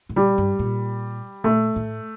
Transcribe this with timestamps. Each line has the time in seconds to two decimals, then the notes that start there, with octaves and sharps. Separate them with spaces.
0.09 A2
0.16 A#2 G3
0.38 G2
0.59 A#2
1.44 A#2 A3
1.76 A2